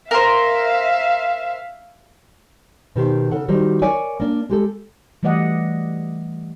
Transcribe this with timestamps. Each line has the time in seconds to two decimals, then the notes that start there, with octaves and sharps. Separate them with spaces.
0.11 A#4 C5 E5 F5
2.96 B2 D#3 G4 C5
3.31 C#3 A4 F#5
3.48 D#3 F#3 G3 C5
3.82 A#4 C#5 D5 G#5
4.20 A#3 D4
4.50 G#3 G4 A4
5.23 E3 G3 A3 D5 D#5 F#5